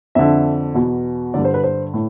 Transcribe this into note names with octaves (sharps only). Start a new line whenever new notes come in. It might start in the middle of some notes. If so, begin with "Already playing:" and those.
F2 D3 E5
E2 B2
G2 D3 D5
C5
B4
C5
A2